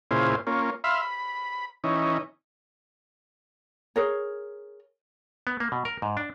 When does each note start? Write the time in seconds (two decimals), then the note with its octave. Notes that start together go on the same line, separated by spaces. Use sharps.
0.11 A#2 C#3 E4 F4 G#4 C5
0.47 A#3 C#4 F4
0.84 E5 F5 B5 C6
1.02 B5
1.84 E3 C#4 D#4
3.96 G#4 A#4 C#5
5.47 B3
5.60 A#3
5.72 B2
5.85 A#4
6.02 G#2
6.17 D4